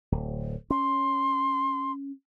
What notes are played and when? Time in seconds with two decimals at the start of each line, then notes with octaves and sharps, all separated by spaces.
0.12 D1
0.70 C#4 C6